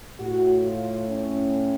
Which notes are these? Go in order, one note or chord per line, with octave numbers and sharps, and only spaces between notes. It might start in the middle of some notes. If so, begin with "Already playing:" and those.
A2 F#4
F4
C#4